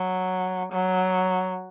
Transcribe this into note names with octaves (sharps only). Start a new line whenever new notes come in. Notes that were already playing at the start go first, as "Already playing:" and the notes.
Already playing: F#3
F#3